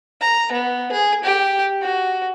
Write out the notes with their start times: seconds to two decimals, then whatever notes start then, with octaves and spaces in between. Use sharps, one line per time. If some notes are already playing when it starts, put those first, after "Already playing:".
0.21 A#5
0.52 B3
0.92 G#4
1.24 G4
1.82 F#4